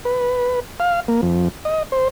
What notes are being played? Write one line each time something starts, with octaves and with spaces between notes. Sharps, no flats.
B4
F5
A#3
F2
D#5
C5